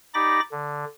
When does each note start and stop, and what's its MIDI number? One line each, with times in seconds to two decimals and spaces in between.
0.14 0.40 63
0.14 0.40 67
0.14 0.40 74
0.14 0.40 83
0.14 0.40 86
0.14 0.40 94
0.52 0.85 50